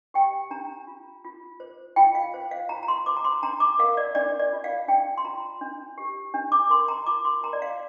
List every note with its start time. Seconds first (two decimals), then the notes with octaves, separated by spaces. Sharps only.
0.14 G4 G5
0.51 D4 A#5
0.87 F4
1.25 F4
1.60 C5
1.96 F4 G5
2.15 F5
2.34 C5
2.51 F5
2.69 F4 A#5
2.83 A#5
2.88 C6
3.06 C5 D6
3.17 A#5
3.24 C6
3.43 D4 A#5
3.60 D6
3.79 A#4 F5
3.97 D5
4.15 D4 D5
4.40 D5
4.52 F4
4.64 F5
4.88 D4 G5
5.18 C6
5.24 F4 A#5
5.61 D4
5.98 G4
6.34 D4
6.52 D6
6.70 A#4 C6
6.88 A#5
7.06 F4 D6
7.25 C6
7.43 A#4 A#5
7.53 D5
7.62 F5